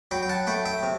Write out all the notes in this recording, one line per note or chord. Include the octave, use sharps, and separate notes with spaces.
F#3 G5 B5
G5
F#5 A5
A3 G5 B5
E5 G5
C3